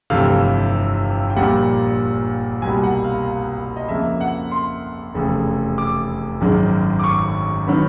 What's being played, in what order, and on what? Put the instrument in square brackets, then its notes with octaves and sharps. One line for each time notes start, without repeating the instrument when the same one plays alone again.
[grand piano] G1 F2 C3 E3 A3 F5
G5
A#1 A#2 G3 A#3 F#5
C2 B2 G3 A#3 G#5
F#5
F5
D#5
F2 C#3 F3 A#3 E5
F#5
C6
F1 E2 C#3
D6
G#1 F#2 D#3 G#3
D6
C#6
D#3 F#3 B3